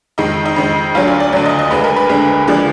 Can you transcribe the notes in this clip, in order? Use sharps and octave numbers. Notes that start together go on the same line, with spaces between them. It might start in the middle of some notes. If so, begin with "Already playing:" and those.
F2 D#3 G#3 D#4
D#4
F2 D#3 G#3
D2 D3 F#3 F4
D5
D5
D2 D3 F#3 D5
D#5
D#5
D2 D3 G#3 B4
A#4
B4
D2 D3 G#3
D3 F3 G#3 D5